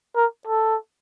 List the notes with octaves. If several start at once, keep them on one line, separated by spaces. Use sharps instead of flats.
A#4
A4